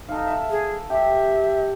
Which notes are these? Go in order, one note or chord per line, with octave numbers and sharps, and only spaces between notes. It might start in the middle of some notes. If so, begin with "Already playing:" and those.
D#4 A4 F5
E5
G#4
G4 E5